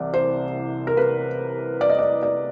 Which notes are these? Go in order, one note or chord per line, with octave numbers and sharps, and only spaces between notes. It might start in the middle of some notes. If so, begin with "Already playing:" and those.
Already playing: C2 C3 E3 D5
C5
A#4
B4
D5
D#5
D5
D5